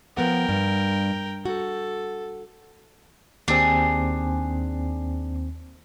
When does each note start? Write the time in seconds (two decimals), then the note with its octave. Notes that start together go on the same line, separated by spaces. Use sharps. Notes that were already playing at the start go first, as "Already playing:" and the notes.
0.17 F3 B3 A#4 F#5 G5
0.49 G2
1.45 F#4 A4
3.48 D#2 C4 D4 G#4